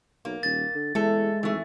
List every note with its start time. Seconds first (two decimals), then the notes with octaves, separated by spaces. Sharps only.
0.25 B1 A#3
0.43 D#1 A6
0.75 D3
0.95 E2 G#3 A3 A4
1.43 G#1 E3 A3